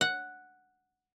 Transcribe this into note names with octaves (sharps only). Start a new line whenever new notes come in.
F#5